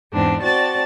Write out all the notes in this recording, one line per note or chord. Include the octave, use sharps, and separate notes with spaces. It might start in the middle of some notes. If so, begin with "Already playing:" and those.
E2 G#2 C4 D4
C4 F#4 D5 A5 A6